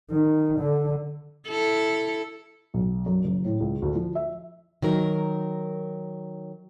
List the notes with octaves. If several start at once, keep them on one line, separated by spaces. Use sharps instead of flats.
D#3
D3
E4 A4
B1
F#2
F#1
A2
C#2
D2
F3
E5
D#3 F#3 A#4